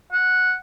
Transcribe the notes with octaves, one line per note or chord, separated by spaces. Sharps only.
F#5